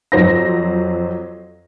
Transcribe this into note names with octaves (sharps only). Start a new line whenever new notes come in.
F2 F#3 C5 A#6